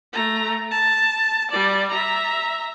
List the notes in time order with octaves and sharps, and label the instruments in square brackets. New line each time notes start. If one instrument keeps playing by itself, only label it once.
[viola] A3 A#5
A5
G3 D5
E5 A#5